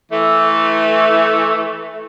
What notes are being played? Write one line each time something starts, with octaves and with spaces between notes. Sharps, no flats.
E3 A3